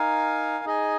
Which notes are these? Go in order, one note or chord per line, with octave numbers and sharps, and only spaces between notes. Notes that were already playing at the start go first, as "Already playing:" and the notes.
Already playing: D#4 A#4 F5 G#5
D#4 G#4 D#5 G#5